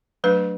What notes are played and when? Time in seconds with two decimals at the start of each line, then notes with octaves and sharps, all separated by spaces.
0.24 F#3 A3 D4 B4